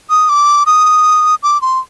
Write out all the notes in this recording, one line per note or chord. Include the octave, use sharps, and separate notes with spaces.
D#6
D6
D#6
D6
C6